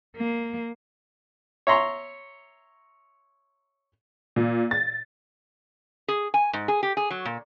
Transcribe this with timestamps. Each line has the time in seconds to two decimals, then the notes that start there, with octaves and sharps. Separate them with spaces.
0.16 A#3
1.67 C#5 E5 A#5 C6 C#6
4.36 A#2
4.71 A6
6.08 G#4
6.34 G#5
6.53 G#2
6.68 G#4
6.83 G4
6.97 G#4
7.11 F#3
7.25 A#2